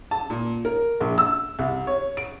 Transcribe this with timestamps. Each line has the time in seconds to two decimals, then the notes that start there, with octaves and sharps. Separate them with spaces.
0.11 A5
0.30 A#2
0.65 A#4
1.01 A#1
1.18 E6
1.59 C2
1.87 C#5
2.17 D7